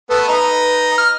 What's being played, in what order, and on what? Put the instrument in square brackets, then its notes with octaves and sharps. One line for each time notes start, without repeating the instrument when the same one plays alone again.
[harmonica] A3 B3 A4 [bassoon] B4
[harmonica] D#4 A#5
F6